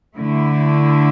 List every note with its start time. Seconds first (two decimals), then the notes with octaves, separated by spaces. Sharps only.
0.16 D3 A3 E4